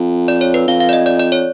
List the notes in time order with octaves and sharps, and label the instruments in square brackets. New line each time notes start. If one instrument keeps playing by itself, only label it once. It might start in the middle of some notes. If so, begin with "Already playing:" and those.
Already playing: [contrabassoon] F2
[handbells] D5
C#5
B4
[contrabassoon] F2 [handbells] F5
[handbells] F5
D5
D#5
D5
D5
C#5